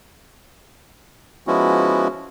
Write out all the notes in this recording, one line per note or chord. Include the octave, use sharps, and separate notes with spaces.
F3 G#3 B3 C#4 E4 F#4